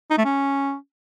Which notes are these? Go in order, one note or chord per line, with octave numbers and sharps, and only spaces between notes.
D#4
A3
C#4